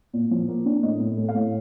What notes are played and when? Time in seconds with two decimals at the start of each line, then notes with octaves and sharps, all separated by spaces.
0.13 A#2
0.31 F3
0.48 A#3
0.66 D4
0.83 A2 D#5
1.00 A2
1.17 A3
1.28 F5
1.34 A2